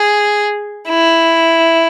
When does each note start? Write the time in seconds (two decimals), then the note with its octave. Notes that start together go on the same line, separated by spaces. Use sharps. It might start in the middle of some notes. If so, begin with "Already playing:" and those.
Already playing: G#4
0.89 E4